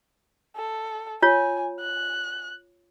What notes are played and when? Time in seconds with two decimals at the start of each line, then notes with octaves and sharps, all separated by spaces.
0.57 A4
1.22 F4 C#5 G#5
1.80 F#6